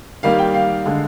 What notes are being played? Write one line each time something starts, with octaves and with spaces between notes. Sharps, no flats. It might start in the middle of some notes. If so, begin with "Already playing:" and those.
D#3 G3 A#3 F5
G5
F5
D3 G#3